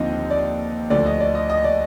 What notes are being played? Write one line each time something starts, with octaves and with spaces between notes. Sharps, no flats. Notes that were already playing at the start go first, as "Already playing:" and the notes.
Already playing: D#2 D3 F3 C4 D#4 D#5
D5
D2 D3 F3 A3 D5
D#5
D5
D#5
D#5
D5